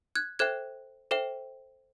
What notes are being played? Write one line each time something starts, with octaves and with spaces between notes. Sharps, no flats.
F#6 G#6
A4 C5 E5 G5 F#6 G#6
A4 C5 E5 G5